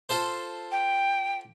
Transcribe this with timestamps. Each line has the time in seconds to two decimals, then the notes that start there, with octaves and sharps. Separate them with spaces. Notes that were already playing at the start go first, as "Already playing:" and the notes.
0.09 F4 A4 C5
0.72 G5